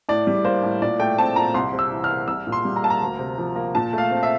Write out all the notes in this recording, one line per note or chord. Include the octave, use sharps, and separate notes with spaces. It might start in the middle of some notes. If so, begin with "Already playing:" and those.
A2 D5
G3
A#3 C5
A2
A#2 D5
A3 G5
C4 A5
A#2 A#5
C2 C6
C3
E6
E3
F6
A#3
C2 E6
A#2
C6
G3
A#5
A#3 A5
A#5
D2
C3
F3
A#3
A#2 A5
A3 F5
C4
E5